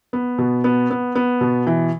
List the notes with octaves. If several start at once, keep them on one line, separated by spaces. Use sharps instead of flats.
B3
B2
B3
B3
B3
B2
E3